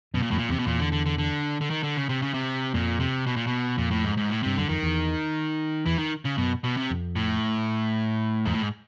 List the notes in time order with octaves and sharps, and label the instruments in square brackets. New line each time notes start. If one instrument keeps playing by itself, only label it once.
[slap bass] F#2 [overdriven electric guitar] B2
[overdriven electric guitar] A#2
[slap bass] F2 [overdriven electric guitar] A2
[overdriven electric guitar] A#2
[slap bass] E2 [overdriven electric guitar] C3
[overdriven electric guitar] B2
[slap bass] E2 [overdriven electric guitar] A#2
[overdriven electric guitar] D3
D3
D3
D3
D3
D#3
D3
C#3
C3
C#3
C3
[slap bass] F2 [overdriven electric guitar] A#2
[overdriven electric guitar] C3
B2
A#2
B2
[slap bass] F2 [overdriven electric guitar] A#2
[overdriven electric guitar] A2
G#2
G#2
A2
[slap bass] G2 [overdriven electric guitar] C3
[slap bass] F#2 [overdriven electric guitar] D3
[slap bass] F2 [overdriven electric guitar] D#3
[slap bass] E2
[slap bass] E2 [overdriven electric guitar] E3
[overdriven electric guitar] D#3
C#3
[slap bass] F#2 [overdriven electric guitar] B2
[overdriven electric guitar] B2
C3
[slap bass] F2
[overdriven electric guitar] A2
[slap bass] E2 [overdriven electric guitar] G#2
[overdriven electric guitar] A2
G#2